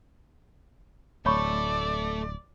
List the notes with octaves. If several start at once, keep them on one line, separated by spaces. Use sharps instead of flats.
D1 A3 A4 C#5 D5 B5 C#6